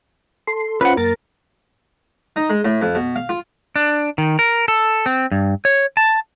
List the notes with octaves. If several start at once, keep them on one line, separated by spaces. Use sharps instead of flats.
A4 C6
C#4 F4 B4 C5 F#5
F#2 A#3 A#4 A6
D#4
G#3
A2
F2
B2
F5
F4
D4
D#3
A#4
A4
C4
G2
C#5
A5